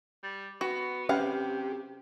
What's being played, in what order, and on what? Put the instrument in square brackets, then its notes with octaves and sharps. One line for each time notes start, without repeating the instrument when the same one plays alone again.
[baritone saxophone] G3
[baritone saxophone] B3 [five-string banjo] F#4
[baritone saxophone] C3 [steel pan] C#4 B4 G#5 [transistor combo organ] G4 [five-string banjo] F5 F#5